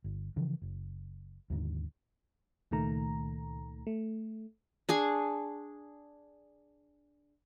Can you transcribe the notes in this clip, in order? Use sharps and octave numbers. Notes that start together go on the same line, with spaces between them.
G1
C#3 E3 F3
F#1
D#2 G#2 D3 D#3
C#2 A#2 D#3 A3 A#5
A3
D4 G#4 G#5 C#6